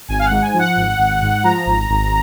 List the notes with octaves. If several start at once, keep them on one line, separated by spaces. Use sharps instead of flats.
G#1 G#5
F5
F#5
G#2
G#5
F3
F#5
G#1
G#1
G#2
F3 A#5
G#1
G#1